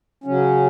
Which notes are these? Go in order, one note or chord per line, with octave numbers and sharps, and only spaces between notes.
C#3 F#3 C#4